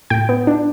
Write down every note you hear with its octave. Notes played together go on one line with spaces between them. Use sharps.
A2 G5
B3
D4